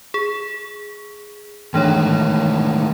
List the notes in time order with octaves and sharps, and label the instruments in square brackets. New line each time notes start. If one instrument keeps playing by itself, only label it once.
[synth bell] G#4
[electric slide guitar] A2 D#3 G#3 [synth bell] E3 D4 C#5